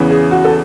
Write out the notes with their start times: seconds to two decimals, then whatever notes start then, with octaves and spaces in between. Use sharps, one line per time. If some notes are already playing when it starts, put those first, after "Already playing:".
Already playing: E2 C#3 E3
0.10 G#4
0.31 F#4
0.44 A4